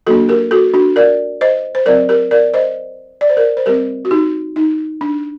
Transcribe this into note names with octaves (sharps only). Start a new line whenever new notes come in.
F#3 A#3 D4 F#4 A4
G4 A#4
F#4 A4
D4 F#4
A#4 D5
C5 D#5
C5
F#3 C4 A#4 D5
G4 A#4
A#4 D5
C5 D#5
D5
C5
A#4 D5
C5
G3 C4 G4 A#4
F#4
D#4 G4
D#4
D4